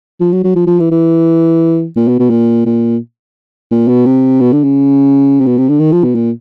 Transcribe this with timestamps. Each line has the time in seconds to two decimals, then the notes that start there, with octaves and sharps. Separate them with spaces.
0.20 F3
0.33 F#3
0.44 F#3
0.56 F3
0.67 F3
0.80 E3
0.91 E3
1.96 A#2
2.08 B2
2.20 B2
2.30 A#2
2.66 A#2
3.71 A#2
3.88 B2
4.06 C3
4.40 B2
4.53 D3
4.64 C#3
5.41 C3
5.46 B2
5.58 C3
5.69 D3
5.80 D#3
5.92 F3
6.04 B2
6.15 A#2